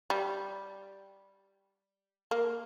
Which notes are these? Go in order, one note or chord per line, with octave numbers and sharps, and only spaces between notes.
G3
A#3